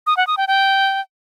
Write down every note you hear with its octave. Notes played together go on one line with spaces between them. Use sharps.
D#6
F#5
D#6
G5
G5